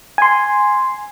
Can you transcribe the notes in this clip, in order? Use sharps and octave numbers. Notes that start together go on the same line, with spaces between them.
G#5 C6